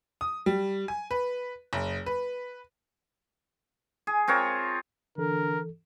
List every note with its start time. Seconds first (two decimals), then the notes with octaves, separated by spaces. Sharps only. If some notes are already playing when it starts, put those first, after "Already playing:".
0.21 D#6
0.46 G3
0.88 G#5
1.11 B4
1.73 F#1
2.06 B4
4.07 G#4
4.28 C4 F4 A#4 C#5
5.18 D3 E3 A4 A#4